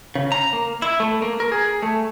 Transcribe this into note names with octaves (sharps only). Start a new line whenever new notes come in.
C#3
A#5
A#3
E4
A3
A#3
A#4
G#4
A3